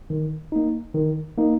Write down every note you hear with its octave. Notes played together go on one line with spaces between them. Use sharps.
D#3
A#3 D#4
D#3
A#3 D#4